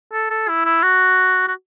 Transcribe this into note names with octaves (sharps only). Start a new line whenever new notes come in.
A4
A4
E4
E4
F#4
F#4